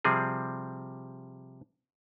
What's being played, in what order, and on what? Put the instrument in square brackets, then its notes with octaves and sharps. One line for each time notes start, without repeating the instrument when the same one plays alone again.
[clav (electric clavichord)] C3 F3 G3 C4 G#4